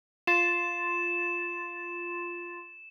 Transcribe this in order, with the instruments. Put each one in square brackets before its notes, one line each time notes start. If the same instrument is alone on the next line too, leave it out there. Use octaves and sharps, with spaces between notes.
[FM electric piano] F4 C6 A6 [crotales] E7